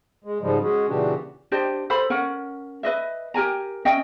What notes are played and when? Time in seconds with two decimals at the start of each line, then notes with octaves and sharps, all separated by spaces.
0.24 G#3
0.41 G#2 C#3 F3 G3 G#3
0.62 G#3 C#4 F#4 G#4
0.88 A#2 C#3 E3 D4 F#4 G4
1.52 D4 G4 C5 D#5
1.90 A4 C5 B5
2.10 C#4 A#4 F#5
2.83 B4 D#5 E5
3.34 G4 A#4 G#5 A#5
3.85 C#4 D#5 E5 G5